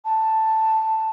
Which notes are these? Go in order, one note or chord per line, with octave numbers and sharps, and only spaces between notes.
A5